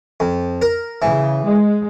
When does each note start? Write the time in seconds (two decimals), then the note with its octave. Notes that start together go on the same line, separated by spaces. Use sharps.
0.20 F2
0.62 A#4
1.02 C#3 E3
1.42 G#3